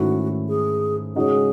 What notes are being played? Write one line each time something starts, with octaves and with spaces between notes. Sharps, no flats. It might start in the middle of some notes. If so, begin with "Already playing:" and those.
Already playing: G#2 D#3 A3 C#4 E4 F#4
G#4
C#3 G#3 D#4 F#4 G#4 C#5